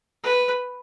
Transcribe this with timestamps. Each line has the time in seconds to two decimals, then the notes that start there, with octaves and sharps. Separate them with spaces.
0.23 B4